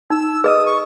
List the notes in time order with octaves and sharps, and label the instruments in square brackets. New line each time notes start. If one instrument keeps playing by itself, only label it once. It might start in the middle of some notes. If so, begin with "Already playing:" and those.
[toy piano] D#4 [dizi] E6
[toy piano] G#4 B4 D#5 [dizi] D#6 E6
[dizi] C#6